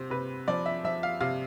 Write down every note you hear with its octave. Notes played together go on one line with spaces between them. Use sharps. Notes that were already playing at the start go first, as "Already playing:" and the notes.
Already playing: C3 C5
C3 B4
F3 D5
E5
F3 E5
F5
C3 F5